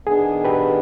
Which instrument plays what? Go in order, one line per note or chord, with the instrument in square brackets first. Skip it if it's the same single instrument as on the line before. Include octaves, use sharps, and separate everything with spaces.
[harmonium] D#3 B3 D4 [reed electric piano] G#4
[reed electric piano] G4 B4